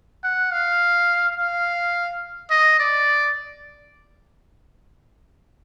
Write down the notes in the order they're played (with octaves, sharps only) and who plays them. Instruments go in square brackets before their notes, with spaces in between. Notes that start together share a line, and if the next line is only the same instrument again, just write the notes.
[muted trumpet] F#5
F5
F5
D#5
D5